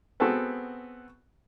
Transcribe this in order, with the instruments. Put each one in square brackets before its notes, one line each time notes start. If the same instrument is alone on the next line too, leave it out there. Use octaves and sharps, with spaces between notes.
[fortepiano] B3 C4 F#4 G#4 A4 B4